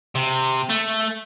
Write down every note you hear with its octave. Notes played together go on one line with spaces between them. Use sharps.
C3
A3